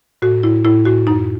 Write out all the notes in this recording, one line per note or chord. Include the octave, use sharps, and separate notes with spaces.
A2 F#4
A2 E4
A2 E4
A2 F#4
F#2 D#4